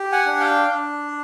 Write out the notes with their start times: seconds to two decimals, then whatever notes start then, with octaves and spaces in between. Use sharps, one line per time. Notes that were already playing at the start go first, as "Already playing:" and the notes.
Already playing: G4
0.12 F#5 G#5
0.26 D4
0.40 F5 G5
0.70 D4